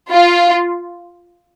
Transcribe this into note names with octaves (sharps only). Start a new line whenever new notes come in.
F4